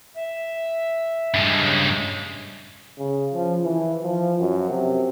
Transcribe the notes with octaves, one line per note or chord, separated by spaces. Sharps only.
E5
G2 G#3
C#3
C#3
F3
E3
F3
F#2
C3